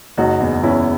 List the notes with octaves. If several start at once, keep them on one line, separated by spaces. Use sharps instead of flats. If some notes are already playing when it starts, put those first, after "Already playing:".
F#1 D#4 F#4
E2
E2 C#4 E4